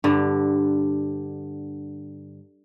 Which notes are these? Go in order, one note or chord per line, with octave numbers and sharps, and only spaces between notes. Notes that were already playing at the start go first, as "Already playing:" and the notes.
G2 D3